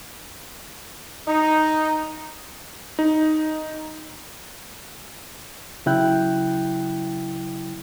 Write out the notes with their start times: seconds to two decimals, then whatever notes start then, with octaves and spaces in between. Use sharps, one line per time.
1.28 D#4
2.99 D#4
5.86 C#3 F#3 E4 G5 F#6 G6